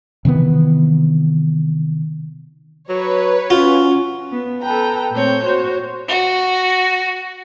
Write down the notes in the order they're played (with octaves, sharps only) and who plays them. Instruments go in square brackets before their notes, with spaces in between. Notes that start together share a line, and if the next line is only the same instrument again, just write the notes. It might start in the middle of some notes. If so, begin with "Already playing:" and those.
[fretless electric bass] C3 D#3 E3 B3
[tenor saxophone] F#3 [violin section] B4 C#5
[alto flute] C#4 [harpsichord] F4 [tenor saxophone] F#4
[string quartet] B3
A4 B4 G5 A#5
A#2 A3 C4 C#5 G6
F#4 C5 C#5
[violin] F#4